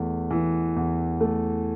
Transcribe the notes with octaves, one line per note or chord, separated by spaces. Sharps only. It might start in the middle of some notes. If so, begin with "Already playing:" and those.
Already playing: E2 A3
E3
E2
A3